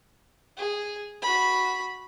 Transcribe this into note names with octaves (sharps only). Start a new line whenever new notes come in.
G#4
F#4 B5